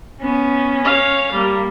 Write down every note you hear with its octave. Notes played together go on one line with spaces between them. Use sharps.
B3 C#4
C#5 F5
G3 A#3